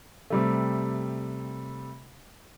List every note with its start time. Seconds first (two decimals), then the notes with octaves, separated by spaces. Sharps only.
0.30 C3 G3 A3